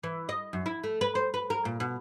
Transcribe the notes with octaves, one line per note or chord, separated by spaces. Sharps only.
E3
D#5
F#2
E4
A3
B4
C5
B4
A#4
A#2
B2